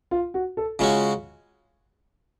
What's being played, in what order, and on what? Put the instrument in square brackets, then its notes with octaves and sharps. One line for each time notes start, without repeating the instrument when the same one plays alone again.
[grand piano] F4
F#4
A4
[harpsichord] C#3 G#3 C#4 F#4 [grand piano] F4